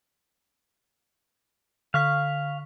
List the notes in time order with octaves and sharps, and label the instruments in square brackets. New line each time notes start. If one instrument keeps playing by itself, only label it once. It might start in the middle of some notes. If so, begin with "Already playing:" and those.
[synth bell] D3 C#6 B6 [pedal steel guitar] F5